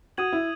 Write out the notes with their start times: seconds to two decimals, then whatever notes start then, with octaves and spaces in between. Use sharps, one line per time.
0.17 F#4 D#6 G#6 D#7 F#7
0.33 E4